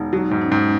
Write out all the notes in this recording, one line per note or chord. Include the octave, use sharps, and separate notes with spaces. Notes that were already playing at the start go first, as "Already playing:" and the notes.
Already playing: E1 D#4
F#3 D#4
G#2 D#4
C#4
G#2 D#4